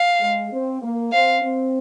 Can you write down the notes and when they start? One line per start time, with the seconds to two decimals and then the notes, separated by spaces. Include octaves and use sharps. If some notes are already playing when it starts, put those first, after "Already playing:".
Already playing: F5
0.21 G#3
0.51 C4
0.82 A#3
1.12 C4 F5
1.43 C4